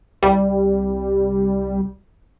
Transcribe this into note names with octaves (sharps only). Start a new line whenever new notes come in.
C2 G3